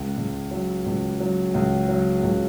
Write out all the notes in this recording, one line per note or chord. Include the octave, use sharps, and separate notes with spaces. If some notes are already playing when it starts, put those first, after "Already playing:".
Already playing: C#2
C#2
F#3
C#2
F#3
C#2
F#3
C#2